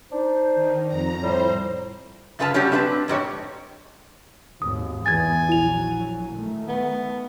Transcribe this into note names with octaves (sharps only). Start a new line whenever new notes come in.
D4 D#4 C5
D#3
F2 A#5
A2 G3 C5
F#2 C#3 F4 B4 G#5 A5
C#3 F#3 G3 C#4 D4 G4
C4 D4 B4 D#5 A5
F2 G#2 G4 C#5
G#1 D#2 D#6
E2 G#5 G#6 A6
A#1 F#3 E4 F7
D#3 A3
B3